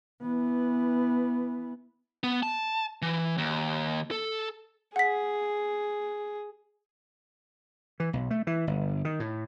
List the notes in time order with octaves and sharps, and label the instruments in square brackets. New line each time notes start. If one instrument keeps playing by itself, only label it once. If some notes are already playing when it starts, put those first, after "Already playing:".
[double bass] E3 B3
[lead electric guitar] B3
A5
E3
D#2
A4
[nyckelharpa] G#4 [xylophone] F#5 B6
[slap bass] E3
B1
A3
E3
G1
D#3
A2